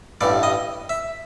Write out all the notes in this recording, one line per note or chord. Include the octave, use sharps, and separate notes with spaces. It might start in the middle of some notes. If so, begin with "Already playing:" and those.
A1 G2 E3 D5
D#5
E5